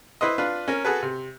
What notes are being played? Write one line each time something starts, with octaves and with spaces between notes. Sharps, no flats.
E4 B4 C5 D#5
D4 F4 B4
C#4 A#4
F#4 G#4 A4 B4
C3